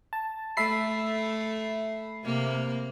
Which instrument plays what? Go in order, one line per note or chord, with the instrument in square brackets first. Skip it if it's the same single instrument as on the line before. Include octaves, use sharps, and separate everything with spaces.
[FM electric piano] A5
[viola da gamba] A3 [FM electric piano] E5 B5 C7
[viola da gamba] C3 A#3